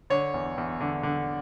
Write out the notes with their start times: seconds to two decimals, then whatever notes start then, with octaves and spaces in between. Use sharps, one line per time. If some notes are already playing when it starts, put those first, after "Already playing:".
0.10 D3 C#5
0.34 E2
0.58 E2
0.81 D3
1.03 D3